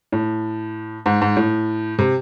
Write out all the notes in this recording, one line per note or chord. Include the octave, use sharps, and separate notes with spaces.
A2
G#2
G#2
A2
C3